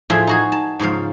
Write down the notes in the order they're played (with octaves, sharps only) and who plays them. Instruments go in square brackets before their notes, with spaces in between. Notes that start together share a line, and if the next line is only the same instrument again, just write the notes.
[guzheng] A2 F3 G#4 E5 C6
D#4 F#4 G#4
A5
G#2 C#3 F3 F5